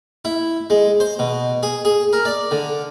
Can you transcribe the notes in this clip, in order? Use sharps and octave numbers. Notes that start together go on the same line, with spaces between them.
E4
G#3
C5
B2
G#4
G#4
A#4
D5
D3